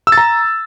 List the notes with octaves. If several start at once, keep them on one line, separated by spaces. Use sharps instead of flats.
E6
A6
A#5